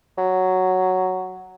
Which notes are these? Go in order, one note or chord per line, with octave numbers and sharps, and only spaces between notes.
F#3